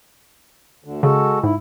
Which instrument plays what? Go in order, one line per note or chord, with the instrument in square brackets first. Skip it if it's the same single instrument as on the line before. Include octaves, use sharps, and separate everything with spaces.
[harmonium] D2 D3
[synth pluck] C#3 [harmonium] G#3 F#4 A4
[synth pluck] G#2 [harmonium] E4